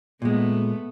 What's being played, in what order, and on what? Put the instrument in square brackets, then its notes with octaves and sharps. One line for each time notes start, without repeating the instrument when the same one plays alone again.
[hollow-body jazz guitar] A#2 G#3 [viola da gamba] A3 B3